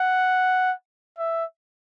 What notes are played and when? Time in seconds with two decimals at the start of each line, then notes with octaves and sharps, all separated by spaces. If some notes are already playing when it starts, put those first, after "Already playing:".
Already playing: F#5
1.18 E5